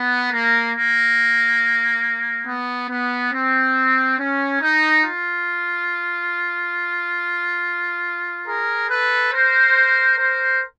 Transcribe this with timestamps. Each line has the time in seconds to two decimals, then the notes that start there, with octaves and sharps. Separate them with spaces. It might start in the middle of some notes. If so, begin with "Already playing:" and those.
Already playing: B3
0.31 A#3
0.75 A#3
2.46 B3
2.89 B3
3.32 C4
4.18 C#4
4.61 D#4
5.04 F4
8.46 G#4 A#4
8.89 A4 B4
9.31 A#4 C5
10.17 A#4 C5